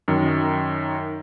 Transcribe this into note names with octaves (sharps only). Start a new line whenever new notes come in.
F#2 D#3